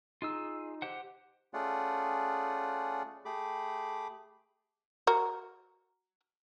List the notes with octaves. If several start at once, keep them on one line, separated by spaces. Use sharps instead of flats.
D#4 F4 G#4 E6
G4 C5 F#5
A3 C#4 F4 G#4 D5 F#5
A3 G4 G#4 B5 D6
F#4 A#4